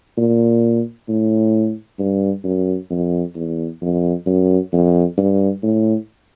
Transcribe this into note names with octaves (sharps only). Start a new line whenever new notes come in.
A#2
A2
G2
F#2
F2
E2
F2
F#2
F2
G2
A2